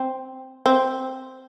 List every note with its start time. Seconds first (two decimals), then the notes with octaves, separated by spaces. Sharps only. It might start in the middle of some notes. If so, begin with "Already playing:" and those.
Already playing: C4
0.66 C4